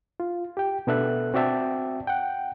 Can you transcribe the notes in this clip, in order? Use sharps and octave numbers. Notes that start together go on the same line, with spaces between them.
F4
G4 G5
B2 B3 D4 A4 E5 F#6
C4 F#4 D5 E5 G5 A5
F#5 G5